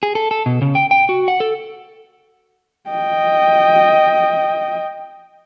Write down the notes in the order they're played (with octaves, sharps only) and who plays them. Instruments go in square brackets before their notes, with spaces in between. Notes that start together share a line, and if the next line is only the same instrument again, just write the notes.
[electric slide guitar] G#4
A4
A4
B2
C#3
G5
G5
F#4
F#5
A4
[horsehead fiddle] D#5 G5